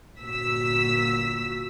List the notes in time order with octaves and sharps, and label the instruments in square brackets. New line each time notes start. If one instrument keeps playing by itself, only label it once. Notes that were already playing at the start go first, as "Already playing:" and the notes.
[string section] G1 A#2 F#4 E6 B6